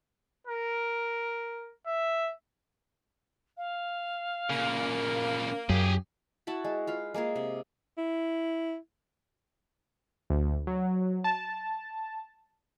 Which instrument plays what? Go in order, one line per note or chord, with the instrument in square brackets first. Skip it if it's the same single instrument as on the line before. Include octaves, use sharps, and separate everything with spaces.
[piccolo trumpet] A#4
E5
[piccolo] F5
[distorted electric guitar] A#2 C#3 [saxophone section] A#3
[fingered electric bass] F#2 [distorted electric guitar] G4 G#4
[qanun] E4 F#4 A5 B5
G#3
F4 B4 F5
G#3 A#3 F4 G#4
C3
[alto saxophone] E4
[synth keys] D2
F#3
A5